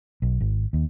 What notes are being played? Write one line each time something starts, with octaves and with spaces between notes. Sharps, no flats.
B1
G#1
D#2